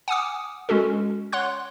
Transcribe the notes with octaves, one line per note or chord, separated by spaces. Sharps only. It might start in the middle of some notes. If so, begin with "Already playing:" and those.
F#5 G#5 D6 D#6
G#3 C#4 F#4 A4
C#5 F#5 C6 F#6